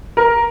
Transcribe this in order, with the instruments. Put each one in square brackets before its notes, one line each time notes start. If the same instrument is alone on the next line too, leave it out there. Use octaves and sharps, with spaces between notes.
[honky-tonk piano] A#4